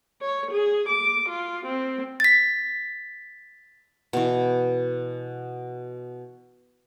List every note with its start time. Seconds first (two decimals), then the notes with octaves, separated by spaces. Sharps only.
0.22 C#5
0.51 G#4
0.89 D6
1.29 F4
1.66 C4
2.20 A6 B6
4.13 B2 E3